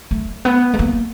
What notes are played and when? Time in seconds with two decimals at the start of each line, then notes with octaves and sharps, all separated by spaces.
0.11 A3
0.45 B3
0.73 A3
0.79 A#3